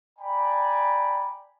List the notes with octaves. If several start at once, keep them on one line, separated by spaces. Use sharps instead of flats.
D5 G5 G#5 A#5 B5